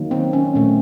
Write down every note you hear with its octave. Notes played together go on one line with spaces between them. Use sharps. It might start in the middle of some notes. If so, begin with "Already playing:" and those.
Already playing: D#3 F#3 A#3
C4
C#4
A#2 A3